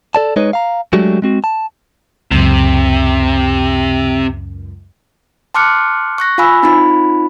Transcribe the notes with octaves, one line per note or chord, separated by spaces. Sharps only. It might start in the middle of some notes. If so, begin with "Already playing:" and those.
A4 D5 A5
G#3 D#4 B4 C#5 D#5
F5 A#5
F#3 G#3 A3 D4 F#4 G4
G#3 C4 F#4
A5
C#2 F#2 C3
A5 C6 D6 F6 F#6 C#7
C#6 F#6 A#6
F4 F5 G#5 B5 E6
C4 D#4 F4 B5